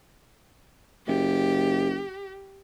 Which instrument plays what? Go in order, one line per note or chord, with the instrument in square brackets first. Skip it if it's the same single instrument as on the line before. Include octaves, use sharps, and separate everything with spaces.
[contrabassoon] F#1 [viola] G4